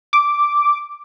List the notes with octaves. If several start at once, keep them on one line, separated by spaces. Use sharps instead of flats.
D6